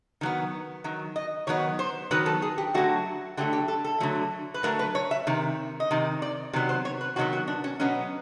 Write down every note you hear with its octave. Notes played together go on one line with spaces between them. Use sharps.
D#3 F#3 B3
D#3 F#3
D#5
D#3 F#3 B3 C#5
C5
D#3 F#3 B3 B4
A4
G#4
G4
D3 F#3 A3 F#4
D3 F#3 A3 G4
G4
A4
A4
D3 F#3 A3
B4
D3 F#3 A3 A#4
B4
C#5
E5
C3 D#3
D#5
C3 D#3
D5
C3 D#3 F#3 B3
C5
C#5
B4
C3 D#3 F#3 B3 F#4
F#4
D4
C#4
B2 F#3 B3 C#4